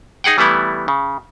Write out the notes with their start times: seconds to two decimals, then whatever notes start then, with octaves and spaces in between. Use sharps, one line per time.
0.24 D#4 G#4 F#5 G5
0.38 E3 G3 A3 B3 E4
0.88 C#3